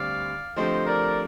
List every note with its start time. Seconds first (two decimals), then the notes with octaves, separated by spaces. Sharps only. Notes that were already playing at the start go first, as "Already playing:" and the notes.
Already playing: D2 D3 G3 C4 D5 F5
0.56 D3 F3 A3 C4 G4 C5 D#5
0.87 A#4 D5